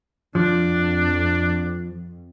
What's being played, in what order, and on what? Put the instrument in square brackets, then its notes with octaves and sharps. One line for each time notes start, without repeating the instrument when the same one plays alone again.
[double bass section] F2 [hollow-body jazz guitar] F3 [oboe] D4